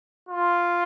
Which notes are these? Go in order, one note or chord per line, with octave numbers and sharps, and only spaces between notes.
F4